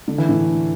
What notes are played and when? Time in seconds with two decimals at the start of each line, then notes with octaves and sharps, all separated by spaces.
0.08 D3
0.18 E3
0.29 A2 D3